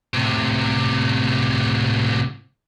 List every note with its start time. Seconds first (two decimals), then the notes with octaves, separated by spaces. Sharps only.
0.14 A2 C3